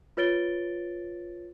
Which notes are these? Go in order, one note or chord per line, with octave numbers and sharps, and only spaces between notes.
F4 B4 C#5 A6 D7 G7